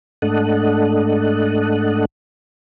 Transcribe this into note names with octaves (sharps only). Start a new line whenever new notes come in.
G#2 A3 D4 A4 D#5 F#5